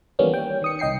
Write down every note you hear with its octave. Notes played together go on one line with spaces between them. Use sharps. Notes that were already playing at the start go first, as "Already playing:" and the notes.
D#3 E3 G3 A#3 B3 C#4
G5
D#3 D#6 C#7
C2 D#5 G5 C7 C#7